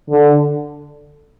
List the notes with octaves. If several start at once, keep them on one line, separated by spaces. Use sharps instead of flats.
D3